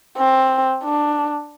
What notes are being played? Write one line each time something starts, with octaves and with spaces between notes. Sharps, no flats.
C4
D4